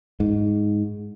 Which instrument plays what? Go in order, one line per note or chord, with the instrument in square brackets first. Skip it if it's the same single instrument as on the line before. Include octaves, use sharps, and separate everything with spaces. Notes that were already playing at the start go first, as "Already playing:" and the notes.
[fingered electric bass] G#2